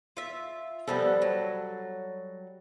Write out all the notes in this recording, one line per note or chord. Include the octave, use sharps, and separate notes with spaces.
F4 E5
F3 G3 B3 C4 A4
F#3